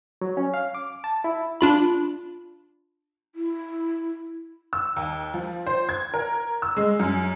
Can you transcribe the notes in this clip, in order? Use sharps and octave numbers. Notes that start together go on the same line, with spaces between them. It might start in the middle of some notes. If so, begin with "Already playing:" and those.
F#3
C#4
F5
D6
A5
E4
D4 F4 B5
E4
E6
D#2
F3
C5
G#6
A#4
E6
G#3
F#2